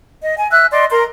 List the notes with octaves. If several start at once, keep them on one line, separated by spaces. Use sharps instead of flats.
D#5
G#5
E5 E6 F#6
D5 D#5 C6
A#4 A#5 C6